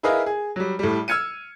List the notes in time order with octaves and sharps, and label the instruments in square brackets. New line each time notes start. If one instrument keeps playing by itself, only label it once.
[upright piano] E4 G#4 A#4 B4 D#5 F5
G#4
F#3 G3
A2 G3
E6 F6 G#6 C#7 D#7